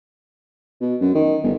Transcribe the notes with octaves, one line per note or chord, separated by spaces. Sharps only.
B2
F#2
D#3
G1